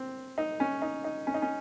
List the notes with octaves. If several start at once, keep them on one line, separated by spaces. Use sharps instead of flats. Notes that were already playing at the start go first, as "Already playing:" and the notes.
Already playing: C4
D#4
C#4
D#4
D#4
C#4
D#4
C#4